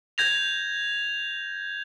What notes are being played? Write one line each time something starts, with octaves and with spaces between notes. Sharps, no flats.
G6 G#6 A#6 F7